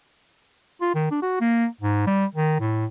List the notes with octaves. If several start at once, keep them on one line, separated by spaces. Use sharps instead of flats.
F4
D#3
D4
F#4
A#3
G#2
G3
D#3
A2